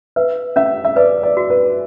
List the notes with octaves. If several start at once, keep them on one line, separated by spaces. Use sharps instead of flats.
B4 E5
C#4 E5
E5
B4 D5
D5
F#4
B4